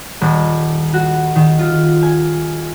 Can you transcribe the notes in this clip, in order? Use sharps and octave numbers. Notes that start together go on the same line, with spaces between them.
D#1
F#4
D#3
F4
G#5